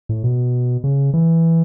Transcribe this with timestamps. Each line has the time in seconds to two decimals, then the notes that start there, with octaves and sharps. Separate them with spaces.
0.09 A2
0.24 B2
0.84 C#3
1.14 E3